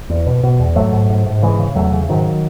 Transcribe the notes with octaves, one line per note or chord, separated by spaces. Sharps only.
E2
B2
B2
E2
G#2 F#3 A3
G#2
G#2
G#2
C#3 E3 G#3
C#3
E2 F#3 A3
C#3
G#2 D#3 F#3